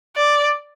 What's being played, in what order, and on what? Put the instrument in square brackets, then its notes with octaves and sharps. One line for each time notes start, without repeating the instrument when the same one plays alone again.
[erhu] D5